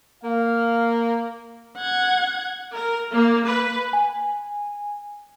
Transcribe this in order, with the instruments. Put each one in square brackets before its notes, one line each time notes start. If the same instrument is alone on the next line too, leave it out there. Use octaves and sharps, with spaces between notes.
[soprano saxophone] A#3 [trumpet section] F5
[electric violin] F#5 G#6
[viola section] A#4
A#3
B4
[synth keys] G#5